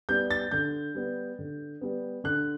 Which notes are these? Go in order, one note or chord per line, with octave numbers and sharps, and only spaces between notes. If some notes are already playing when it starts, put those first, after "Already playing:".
G3 B3 G6
A6
D3 G6
G3 B3
D3
G3 B3
D3 F#6